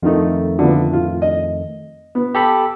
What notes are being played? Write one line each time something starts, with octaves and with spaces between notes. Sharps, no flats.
F2 D#3 A3 D#4 F4
D3 F3 B3
A2 F4
D#5
B3
G4 A4 B5